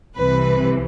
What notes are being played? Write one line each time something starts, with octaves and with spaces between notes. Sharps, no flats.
C2 C3 E3 B4